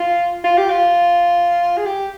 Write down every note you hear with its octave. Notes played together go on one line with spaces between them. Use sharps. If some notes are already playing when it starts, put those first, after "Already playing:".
Already playing: F4
F4
G4
F4
G#4
G4